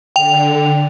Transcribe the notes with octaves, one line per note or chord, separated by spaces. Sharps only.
D3 G5 F7